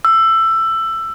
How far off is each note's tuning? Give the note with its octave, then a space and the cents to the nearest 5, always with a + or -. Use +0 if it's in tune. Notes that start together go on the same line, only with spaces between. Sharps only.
E6 +15